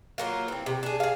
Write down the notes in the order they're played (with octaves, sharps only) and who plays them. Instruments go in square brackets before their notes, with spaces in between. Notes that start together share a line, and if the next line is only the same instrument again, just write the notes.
[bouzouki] F#3 A#3 F4
E3 C4
C3
D4 G#4
G#4 F5